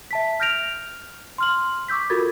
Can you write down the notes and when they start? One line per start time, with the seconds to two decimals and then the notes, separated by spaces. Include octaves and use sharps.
0.11 E5 A5 B6
0.40 F6 G6 A#6 D7 F7
1.38 C6 F6 F#7
1.88 C#6 D6 E6 G6 B6
2.10 F4 F#4 A4 A#4 G#6 A6